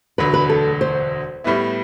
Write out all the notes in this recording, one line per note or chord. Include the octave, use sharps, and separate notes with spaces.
E1 D2 D3 F#3 B4
B4
A4
C5
A2 G3 B3 E4